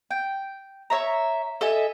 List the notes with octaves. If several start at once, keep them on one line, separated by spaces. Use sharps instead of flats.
G5
C#5 E5 A#5
A4 D#5 E5 G#5